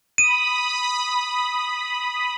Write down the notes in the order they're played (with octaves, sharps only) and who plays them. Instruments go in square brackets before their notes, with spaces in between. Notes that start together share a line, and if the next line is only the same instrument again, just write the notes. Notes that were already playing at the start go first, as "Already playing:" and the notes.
[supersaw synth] B5 D#6 [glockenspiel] D#7